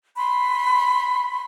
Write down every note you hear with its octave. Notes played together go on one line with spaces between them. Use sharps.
B5 C6